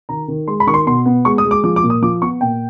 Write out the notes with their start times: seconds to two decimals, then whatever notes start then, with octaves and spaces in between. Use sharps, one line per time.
0.09 D#3 A#5
0.28 D#3
0.48 G#3 C6
0.60 B5
0.67 D#3 C#6
0.74 C6
0.86 B2 C6
1.06 B3
1.25 G#3 C#6
1.38 D#6
1.45 G#3
1.51 D6
1.64 F3 D6
1.76 D6
1.83 A#2
1.90 D#6
2.02 F3 D6
2.21 B3 C#6
2.41 A#2 G5